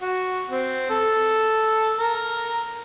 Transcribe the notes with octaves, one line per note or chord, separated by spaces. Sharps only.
F#4
C4
A4
A#4